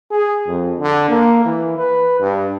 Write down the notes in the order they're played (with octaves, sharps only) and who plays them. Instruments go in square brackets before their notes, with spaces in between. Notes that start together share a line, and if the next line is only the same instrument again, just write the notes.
[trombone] G#4
F2
D3
A#3
E3
B4
G2